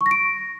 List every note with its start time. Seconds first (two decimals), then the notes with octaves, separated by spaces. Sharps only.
0.01 C#6
0.06 A#6
0.11 D7